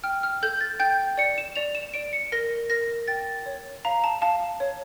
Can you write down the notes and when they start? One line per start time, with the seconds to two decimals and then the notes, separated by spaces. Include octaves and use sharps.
0.04 G5 F6
0.23 F6
0.43 A4 G6
0.61 A6
0.80 G5 G6
1.18 D5 C#7
1.38 E7
1.56 D5 F7
1.75 E7
1.94 D5 D7
2.13 C#7
2.32 A#4 A#6
2.70 A#4 A#6
3.08 G5 A6
3.46 C#5
3.85 F5 A#5
4.04 A5
4.22 F5 A5
4.60 C#5